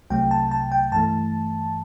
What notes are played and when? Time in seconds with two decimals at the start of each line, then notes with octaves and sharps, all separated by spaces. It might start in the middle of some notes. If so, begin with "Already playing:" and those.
0.10 C2 C3 F#3 A3 G5
0.31 A5
0.51 A5
0.72 G5
0.92 G2 E3 A3 A5